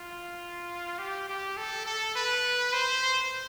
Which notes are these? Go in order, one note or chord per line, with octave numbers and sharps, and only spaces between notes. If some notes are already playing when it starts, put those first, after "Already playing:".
Already playing: F4
G4
G4
A4
A4
B4
C5